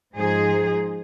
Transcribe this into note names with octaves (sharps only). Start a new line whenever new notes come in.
G#2 F3 D#4 G#4 C5